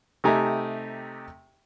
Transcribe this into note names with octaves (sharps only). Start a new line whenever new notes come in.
C3 A3 D#4 G4 G#5 A#5